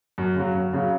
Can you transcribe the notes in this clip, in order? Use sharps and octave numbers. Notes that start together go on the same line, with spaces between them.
F#2
C#3 F#3
F#2
C#3 F#3